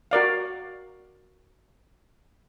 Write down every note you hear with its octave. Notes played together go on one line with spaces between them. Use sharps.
F#4 A#4 D5 F5